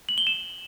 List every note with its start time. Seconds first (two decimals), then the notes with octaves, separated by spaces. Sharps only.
0.09 F#7
0.18 G7
0.27 E7